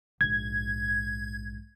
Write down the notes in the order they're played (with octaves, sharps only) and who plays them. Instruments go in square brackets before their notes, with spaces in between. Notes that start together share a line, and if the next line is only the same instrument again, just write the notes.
[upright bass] A#1 G#2 [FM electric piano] G#6